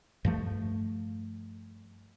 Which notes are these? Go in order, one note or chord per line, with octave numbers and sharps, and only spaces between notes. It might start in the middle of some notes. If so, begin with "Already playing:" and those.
G2 F3 A3